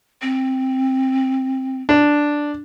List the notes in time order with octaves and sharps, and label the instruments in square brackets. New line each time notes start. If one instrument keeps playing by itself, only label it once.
[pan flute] C4
[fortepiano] D4